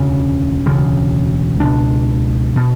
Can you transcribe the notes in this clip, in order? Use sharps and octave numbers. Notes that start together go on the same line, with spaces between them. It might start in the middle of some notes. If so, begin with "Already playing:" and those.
Already playing: E1 D2 C#3 C#4
E1 D2 C#3
C#2 B2 D4
B2